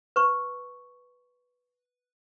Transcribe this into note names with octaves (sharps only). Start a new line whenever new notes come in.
B4 C#6